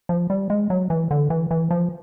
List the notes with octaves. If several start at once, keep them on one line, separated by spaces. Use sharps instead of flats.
F3
G3
G#3
F#3
E3
D3
E3
E3
F3